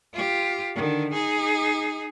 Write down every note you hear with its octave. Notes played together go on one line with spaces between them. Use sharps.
F4 G4
D3 D#3
D#4 G#4